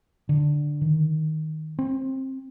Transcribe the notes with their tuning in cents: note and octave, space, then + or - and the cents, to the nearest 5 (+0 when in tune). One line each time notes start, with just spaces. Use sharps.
D3 +5
D#3 +5
C4 +20